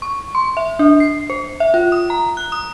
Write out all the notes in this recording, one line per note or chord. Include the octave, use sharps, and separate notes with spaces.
C#6
C6
E5
D4
C7
C5
E5
F4
D#6
A#5
F#6
D#6